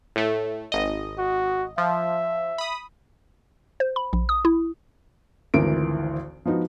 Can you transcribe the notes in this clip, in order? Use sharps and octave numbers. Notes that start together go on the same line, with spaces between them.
A2 A3
G#1 D#5
F#4
F3 E5
B5 D#6
C5
B5
A#1
D#6
E4
G#1 D2 E3 F4 A#4 D7
F3 B3 D#4 F#4